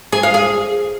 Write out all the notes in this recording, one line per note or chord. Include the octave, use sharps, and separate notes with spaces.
G#4
F5
G#4